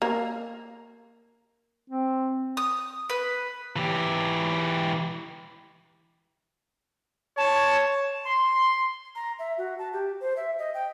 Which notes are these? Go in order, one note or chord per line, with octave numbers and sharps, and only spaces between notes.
A#3
C4
D#6
B4
E3 G4
C#5 A5
C6
A#5
E5
F#4
A5
G4
C5
E5
D#5
G5